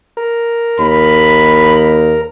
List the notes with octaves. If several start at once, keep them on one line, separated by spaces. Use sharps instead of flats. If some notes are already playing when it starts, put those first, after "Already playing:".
A#4
D#2 B5